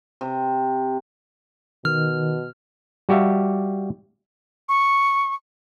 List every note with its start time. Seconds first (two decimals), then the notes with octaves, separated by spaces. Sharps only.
0.21 C3
1.85 B2 D#3 F6
3.09 G3 F#4 G4 E5 F5
4.69 C#6